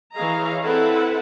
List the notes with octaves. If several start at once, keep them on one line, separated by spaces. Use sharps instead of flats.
E3 G#4 C#5 D#5 F5 A#5
C4 E4 A4 B4 F#5